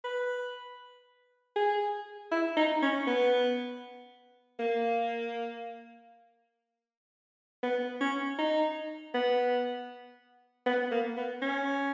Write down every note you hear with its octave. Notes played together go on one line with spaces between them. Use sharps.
B4
G#4
E4
D#4
C#4
B3
A#3
B3
C#4
D#4
B3
B3
A#3
B3
C#4